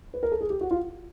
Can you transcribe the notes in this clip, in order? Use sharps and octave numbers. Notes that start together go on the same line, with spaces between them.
B4
A#4
A4
G#4
G4
F#4
F4